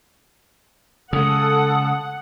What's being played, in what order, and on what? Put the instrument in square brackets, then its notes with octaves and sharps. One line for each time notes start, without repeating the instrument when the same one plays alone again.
[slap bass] C#3 G#3 [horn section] A4 [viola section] F#5 [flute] D#6